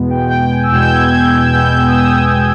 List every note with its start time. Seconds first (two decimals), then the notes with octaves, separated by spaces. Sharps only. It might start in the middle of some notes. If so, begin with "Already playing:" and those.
Already playing: E2 B2 G#3 B3
0.10 G5
0.30 G5
0.51 G#5
0.63 E6
0.71 E2 B2 G#3 B3 G6
0.92 G#6
1.12 G6
1.33 E6
1.53 E2 B2 G#3 B3 G6
1.73 E6
1.87 D#6
1.93 E6
2.36 B2 G#3 B3